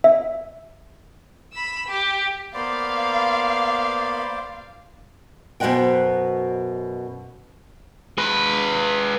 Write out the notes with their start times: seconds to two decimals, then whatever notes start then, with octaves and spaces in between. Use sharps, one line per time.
0.04 E5
1.53 B5 E6
1.88 G4
2.54 A#3 B3 C5 D5 F5 B5
5.60 F#2 B2 C5 D#5 F#5 G5
8.18 G#3 B4